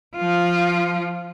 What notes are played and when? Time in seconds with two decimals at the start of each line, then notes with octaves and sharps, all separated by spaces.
0.17 F3 F4